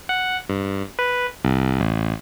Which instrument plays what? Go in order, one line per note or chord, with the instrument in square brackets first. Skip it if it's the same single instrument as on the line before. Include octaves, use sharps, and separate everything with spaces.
[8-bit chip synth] F#5
G2
B4
C2
A1